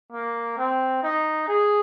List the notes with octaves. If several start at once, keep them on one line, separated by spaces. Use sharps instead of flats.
A#3
C4
D#4
G#4